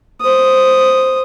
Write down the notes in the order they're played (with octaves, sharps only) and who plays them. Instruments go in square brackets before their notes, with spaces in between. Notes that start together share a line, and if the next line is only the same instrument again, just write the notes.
[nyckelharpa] C5 D#6